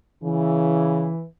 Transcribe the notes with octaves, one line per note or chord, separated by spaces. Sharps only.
C#3 E3